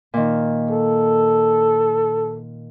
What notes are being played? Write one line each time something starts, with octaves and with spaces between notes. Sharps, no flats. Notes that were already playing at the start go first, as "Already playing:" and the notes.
A#2 D#3
A4